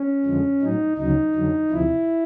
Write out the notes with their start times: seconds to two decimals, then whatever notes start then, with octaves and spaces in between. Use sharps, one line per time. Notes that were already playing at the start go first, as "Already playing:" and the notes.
Already playing: C#4
0.25 F2 D3 F3 G#3
0.61 A2 F#3 D#4
0.98 D2 C#3 F#3 D#4
1.35 F2 D3 F#3
1.71 D2 C3 F3 E4